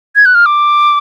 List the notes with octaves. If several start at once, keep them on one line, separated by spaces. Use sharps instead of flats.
G#6
F#6
F6
D6